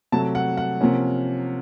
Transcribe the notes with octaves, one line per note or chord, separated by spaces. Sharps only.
C3 F#3 A3 A5
F#5
F#5
C3 F3 A#3 C#4